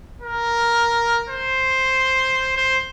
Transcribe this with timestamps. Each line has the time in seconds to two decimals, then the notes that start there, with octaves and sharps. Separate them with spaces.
0.22 A#4
1.29 C5
2.57 C5